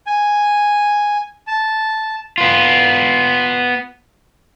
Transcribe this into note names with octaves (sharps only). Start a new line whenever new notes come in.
G#5
A5
B3 F4